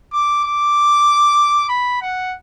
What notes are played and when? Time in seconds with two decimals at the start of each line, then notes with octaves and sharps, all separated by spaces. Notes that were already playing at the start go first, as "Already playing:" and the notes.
0.13 D6
0.44 D6
1.69 B5
2.02 F#5